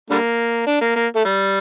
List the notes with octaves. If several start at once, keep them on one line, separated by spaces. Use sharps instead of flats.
D3 G3 A#3
D4
A#3
A#3
A3
G3